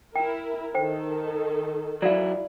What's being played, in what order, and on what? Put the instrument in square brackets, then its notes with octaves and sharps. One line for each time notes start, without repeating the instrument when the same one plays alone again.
[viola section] E4 A#4 [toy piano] G5
[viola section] D#3 A4 [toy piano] C5 G5
[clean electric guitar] F#3 E4 [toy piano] D5 F5